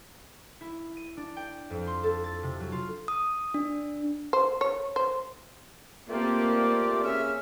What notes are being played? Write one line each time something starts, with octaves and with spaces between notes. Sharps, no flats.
E4
D#7
D4
G5
F2
C6
A4
A6
C3
F#3
F4
D#6
D4
C5
C#5
C5
A3 A#3 C4 F4 G4 D5
C#3 C#4 E5 F6